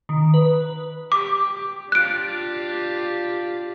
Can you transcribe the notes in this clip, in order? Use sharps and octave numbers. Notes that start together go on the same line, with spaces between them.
D#3
B4
G4 D6
D4 F4 G4 F#6 D7